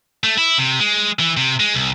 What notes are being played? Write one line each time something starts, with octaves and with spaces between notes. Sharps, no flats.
A3
E4
C3
G#3
E3
C3
G#3
C2